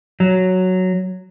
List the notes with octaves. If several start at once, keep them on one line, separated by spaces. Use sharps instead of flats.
F#3